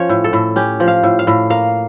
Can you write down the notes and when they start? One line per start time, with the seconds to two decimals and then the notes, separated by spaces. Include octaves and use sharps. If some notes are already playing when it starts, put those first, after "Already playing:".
Already playing: F3 C#4 C#5
0.09 A2
0.24 A4
0.33 A2
0.56 C#4 G4
0.80 F3
0.88 F5
1.03 A2
1.19 F5
1.27 A2
1.50 A#3 F5